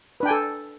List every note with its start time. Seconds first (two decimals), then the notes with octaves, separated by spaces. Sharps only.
0.20 B4
0.23 D4
0.25 G5
0.28 G#5
0.31 A4